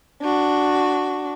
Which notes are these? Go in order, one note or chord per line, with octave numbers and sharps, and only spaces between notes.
D4 F#4